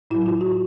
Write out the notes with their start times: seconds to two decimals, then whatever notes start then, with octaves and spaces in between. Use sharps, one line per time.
0.11 A2 F#3 E4
0.26 F4
0.41 F#4